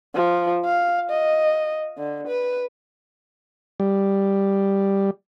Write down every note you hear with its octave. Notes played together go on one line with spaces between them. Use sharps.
F3
F5
D#5
D3
B4
G3